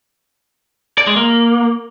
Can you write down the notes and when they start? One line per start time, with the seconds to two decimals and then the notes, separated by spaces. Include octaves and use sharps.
0.98 D5
1.07 G#3
1.16 A#3